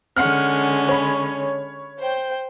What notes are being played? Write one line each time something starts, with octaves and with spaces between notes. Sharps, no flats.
D3 G#3 C#4 F#5 F6
C#5 B5
C5 G5